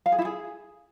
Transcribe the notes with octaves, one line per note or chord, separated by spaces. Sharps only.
F5
G#4
E4
G#4